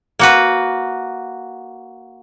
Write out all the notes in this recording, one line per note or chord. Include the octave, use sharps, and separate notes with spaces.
A#3 F#4 B4